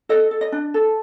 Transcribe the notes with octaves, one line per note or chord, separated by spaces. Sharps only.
A4 D#5
A4
D#5
D4
A4